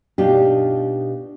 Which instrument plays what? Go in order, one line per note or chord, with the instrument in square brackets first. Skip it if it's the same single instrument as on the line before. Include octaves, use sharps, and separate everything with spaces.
[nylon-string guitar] B2 D4 D#4 F4 G4